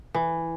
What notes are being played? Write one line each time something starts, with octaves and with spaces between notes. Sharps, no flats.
E3